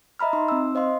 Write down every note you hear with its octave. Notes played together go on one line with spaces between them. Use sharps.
D#5 E5 A#5 B5 F6
D#4 C6
C4 E6
C5 D#5 F5 C6